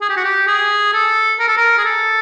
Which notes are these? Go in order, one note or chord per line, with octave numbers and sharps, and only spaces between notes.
G#4
G4
F#4
G4
G#4
A4
A#4
A4
A#4
G#4
A4